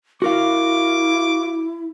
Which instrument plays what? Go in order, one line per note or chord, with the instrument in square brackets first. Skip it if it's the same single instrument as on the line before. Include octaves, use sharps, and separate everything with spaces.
[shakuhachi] E4 [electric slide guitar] F#4 A#4 F5 [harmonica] D6